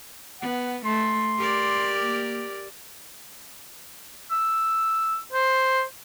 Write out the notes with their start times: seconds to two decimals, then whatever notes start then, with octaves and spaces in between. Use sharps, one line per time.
0.41 B3 F#5
0.85 A3 C6
1.37 G4 A#4 D5
1.99 A#3
4.31 E6
5.32 C5